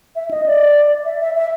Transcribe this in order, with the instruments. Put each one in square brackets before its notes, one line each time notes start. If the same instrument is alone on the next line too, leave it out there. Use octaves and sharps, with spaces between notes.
[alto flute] E5
D#5
D5
E5
E5
E5